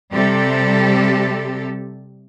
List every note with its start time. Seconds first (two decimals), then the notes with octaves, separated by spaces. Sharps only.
0.11 C3 G3 G4 A4